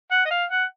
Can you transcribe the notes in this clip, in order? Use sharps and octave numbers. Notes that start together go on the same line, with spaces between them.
F#5
D#5
F5
F#5